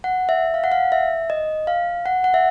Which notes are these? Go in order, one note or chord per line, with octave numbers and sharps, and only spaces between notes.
F#5
E5
F5
F#5
F5
E5
D#5
F5
F#5
F#5
E5